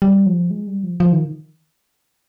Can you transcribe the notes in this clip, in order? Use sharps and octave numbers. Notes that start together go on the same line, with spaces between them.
G3
F3
G#3
G3
F3
F3
D#3